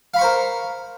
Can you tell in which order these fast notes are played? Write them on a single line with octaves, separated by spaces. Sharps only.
F5 B5 C#6 C5 A#4